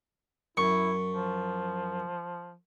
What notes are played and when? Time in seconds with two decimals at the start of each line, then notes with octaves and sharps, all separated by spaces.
0.57 F#2 E4 C#6
1.13 F3